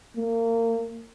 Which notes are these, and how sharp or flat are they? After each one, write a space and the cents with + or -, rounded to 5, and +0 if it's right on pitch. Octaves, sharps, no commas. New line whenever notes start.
A#3 -30